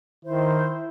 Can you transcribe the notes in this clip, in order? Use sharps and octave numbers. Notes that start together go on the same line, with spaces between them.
D#3 E4 C5